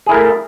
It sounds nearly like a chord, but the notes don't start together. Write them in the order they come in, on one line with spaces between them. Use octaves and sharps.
G#4 E4 A#4 A3